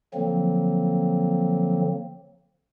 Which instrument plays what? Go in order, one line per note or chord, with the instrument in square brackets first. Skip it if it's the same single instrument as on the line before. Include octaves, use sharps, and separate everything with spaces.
[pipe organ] D3 F3 F#3 A#3 C4